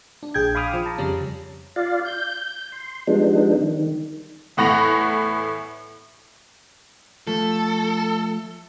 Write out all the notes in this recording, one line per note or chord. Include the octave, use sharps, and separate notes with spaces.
D4
A#1 G#4 G5 G6 G#6
F5 B5 D6 D#6 F6
F3
A5 A#5
F2 C#3 G3 C#4
F4 D5 F5
G6
C6
F3 G3 G#3 B3 D4 D#4
D#3
E2 A2 F#5 B5 A#6 F7
F3 A3 A4